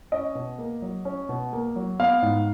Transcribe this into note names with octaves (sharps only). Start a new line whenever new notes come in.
C#4 D#5
B2
A#3
F#3
C#4
B2
A#3
F#3
B3 F5
G#2